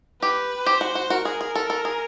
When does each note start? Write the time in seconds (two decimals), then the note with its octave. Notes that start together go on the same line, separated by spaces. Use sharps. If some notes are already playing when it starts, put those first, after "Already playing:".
0.22 G4 B4
0.66 G4 C5
0.81 F#4
0.95 F#4
1.10 F#4 A#4
1.25 G#4
1.41 G#4
1.55 A4
1.70 A4
1.85 G#4